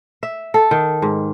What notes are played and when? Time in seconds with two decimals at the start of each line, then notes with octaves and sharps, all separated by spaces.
0.23 E5
0.54 A4
0.71 D#3
1.02 G#2